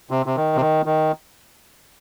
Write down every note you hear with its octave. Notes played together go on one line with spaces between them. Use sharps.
C3
C3
D#3
C3
D#3
D#3